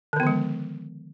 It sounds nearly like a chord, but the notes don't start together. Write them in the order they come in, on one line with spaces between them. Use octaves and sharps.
D3 D#3 B3 F3 G#3